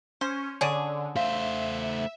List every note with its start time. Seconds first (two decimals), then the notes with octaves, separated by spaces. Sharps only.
0.21 C#4 C5
0.61 D3 C#4 D4 G#4 G#5
1.16 A3 C5 E5 F5